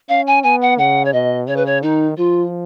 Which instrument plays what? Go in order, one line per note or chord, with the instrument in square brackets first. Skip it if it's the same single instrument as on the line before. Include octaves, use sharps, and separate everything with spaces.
[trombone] C#4 [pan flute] F5
[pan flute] G#5
[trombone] B3 [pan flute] G#5
[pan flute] F#5
[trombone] C#3 [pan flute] F#5
[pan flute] C#5
[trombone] B2 [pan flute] D#5
[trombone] C#3 [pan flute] C#5
[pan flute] B4
C#5
[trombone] D#3 [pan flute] D#4
[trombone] F3 [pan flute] F4